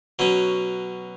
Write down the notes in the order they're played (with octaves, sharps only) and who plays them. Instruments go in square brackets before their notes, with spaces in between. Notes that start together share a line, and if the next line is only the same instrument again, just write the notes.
[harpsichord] B2 F#3 C#4